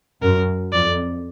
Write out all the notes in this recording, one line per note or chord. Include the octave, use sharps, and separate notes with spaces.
F#2 A#4
F2 D5